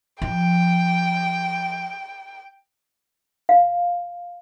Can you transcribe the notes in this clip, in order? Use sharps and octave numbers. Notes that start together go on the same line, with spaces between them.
F3 G5
F5